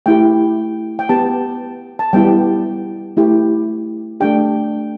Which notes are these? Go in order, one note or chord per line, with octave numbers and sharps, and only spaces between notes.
A3 E4 G4 G5
G5
B3 G4 A5
A5
G3 B3 E4 G4 G5
A3 E4 G4
A3 D4 G4 G5